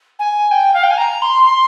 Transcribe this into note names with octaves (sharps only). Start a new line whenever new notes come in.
G#5
G5
F5
G5
G#5
A#5
C6
C6